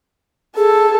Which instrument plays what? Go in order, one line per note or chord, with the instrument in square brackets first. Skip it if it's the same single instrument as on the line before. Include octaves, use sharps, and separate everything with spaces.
[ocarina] G#4 [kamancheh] A4